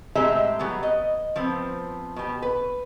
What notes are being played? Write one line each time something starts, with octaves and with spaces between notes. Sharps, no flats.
A2 G#3 C4 G4 E5 A#5
F#3 G3 B3
D#5
F3 B3 C4
B2 G4
B4